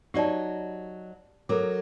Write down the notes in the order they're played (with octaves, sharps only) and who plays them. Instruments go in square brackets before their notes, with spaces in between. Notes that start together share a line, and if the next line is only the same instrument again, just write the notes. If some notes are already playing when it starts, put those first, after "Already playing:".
[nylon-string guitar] F#3 D#4 F#4 [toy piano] G4 D5 A5
[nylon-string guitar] F#3 A#4 [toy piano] A4 D6